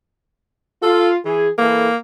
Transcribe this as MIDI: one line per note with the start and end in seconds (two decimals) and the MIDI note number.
0.83 1.16 65
0.83 1.09 69
1.25 1.49 52
1.25 1.49 68
1.58 1.88 52
1.58 1.97 58
1.58 1.88 69